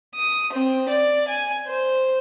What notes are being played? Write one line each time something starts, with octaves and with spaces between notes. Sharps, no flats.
D#6
C4
D5
G#5
C5